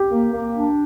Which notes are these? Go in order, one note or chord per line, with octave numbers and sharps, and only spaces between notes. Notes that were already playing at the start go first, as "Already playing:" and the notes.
Already playing: G4
A#3
A#3
D4